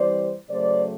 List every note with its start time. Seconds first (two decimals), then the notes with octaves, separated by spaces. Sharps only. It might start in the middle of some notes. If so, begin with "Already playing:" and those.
Already playing: E3 G3 C4 C5 D5
0.49 C#3 F#3 A3 C5 D5